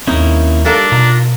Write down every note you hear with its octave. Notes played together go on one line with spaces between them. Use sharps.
D#2 A#3 C4 C#4 D#4 E4
G3 A#3 D4 A4 A#4
B2 F4 A#5